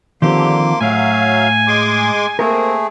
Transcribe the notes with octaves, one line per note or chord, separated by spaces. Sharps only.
D3 D#3 F3 A#3 C4 G4 C6 D6
A2 F#3 E5 F5 G#5
G#3 G#4 C6 D6
A3 A#3 C4 G#4 A#4